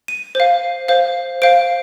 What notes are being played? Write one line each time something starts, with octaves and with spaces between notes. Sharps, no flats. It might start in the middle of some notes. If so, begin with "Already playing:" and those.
D#7
C5 F5
C5 F5
C5 F5 D7